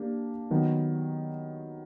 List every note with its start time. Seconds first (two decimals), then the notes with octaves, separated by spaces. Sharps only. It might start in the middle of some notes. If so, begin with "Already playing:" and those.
Already playing: A#3 D4 G4
0.51 D#3 F#3 B3